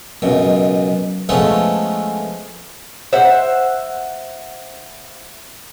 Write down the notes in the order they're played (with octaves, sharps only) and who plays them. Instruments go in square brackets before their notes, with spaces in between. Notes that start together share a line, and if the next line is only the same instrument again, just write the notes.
[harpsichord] C#2 F#2 B2
F3 G#3 A3 B3 C#4 A4
[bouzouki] C5 E5 F#5